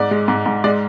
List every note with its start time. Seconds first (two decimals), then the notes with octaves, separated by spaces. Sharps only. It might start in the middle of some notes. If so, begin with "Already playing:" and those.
Already playing: G#2 D5
0.11 G#3
0.28 G#2
0.46 G#2
0.64 G#3 D5